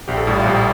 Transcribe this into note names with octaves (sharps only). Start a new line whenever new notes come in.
A#1 G4
A4
A2 G3
F4
A#1 G4